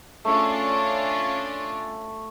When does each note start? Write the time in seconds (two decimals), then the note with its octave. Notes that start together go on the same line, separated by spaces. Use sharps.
0.25 A3 C#4 D4 F4